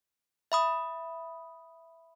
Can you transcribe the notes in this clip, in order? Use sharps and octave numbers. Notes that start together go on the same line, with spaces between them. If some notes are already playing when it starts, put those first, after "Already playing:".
E5 B5 D#6